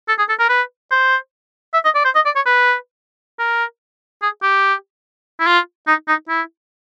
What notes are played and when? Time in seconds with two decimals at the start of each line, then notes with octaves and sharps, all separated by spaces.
0.08 A4
0.19 G#4
0.29 A4
0.39 A#4
0.49 B4
0.91 C5
1.74 E5
1.85 D#5
1.95 D5
2.05 C5
2.15 D#5
2.26 D5
2.36 C#5
2.46 B4
3.39 A#4
4.22 G#4
4.43 G4
5.40 E4
5.47 F4
5.88 D#4
6.08 D#4
6.29 E4